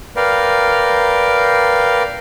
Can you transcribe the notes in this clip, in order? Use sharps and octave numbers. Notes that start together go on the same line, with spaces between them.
A#4 B4 D5 F5 G5